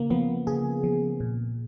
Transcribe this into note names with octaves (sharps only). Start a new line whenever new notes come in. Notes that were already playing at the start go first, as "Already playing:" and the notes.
Already playing: C#3 A#3
F3 B3
C#3 G#4
F3
A#2